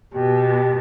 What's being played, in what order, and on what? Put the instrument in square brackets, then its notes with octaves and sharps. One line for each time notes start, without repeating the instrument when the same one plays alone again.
[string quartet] B2 [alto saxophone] G4